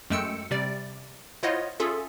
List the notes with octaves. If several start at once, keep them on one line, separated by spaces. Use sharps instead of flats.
F#2 G#3 A3 G5 E6 C#7
C3 G3 D5
E4 F4 C5 C#5 D#5 F#5
C#4 F4 G#4 A4 E5